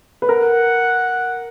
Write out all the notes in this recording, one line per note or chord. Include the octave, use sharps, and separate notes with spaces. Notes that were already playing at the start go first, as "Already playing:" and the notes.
B4
A#4 F#5